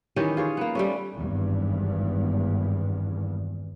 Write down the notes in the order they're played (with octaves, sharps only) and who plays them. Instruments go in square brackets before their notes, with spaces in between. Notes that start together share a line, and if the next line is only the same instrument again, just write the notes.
[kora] D#3 E3 C#4 G4
F4 G#4 C#5
A#3 B3
G3 A3 C#4
[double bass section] G#1 E2 G2